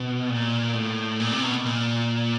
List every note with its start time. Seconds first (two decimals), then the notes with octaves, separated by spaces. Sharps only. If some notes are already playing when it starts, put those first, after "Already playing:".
Already playing: B2
0.30 A#2
0.75 A2
1.20 A#2
1.32 C3
1.43 B2
1.65 A#2